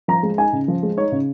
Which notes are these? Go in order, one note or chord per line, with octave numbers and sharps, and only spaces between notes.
F3 A#5
G#3
D#4 G#5
C#3
F3
G#3
D#4 C#5
C#3